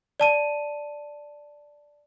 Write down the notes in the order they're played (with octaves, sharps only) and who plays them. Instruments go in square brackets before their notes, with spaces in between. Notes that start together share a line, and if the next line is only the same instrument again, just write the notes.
[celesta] D5 A5 D#7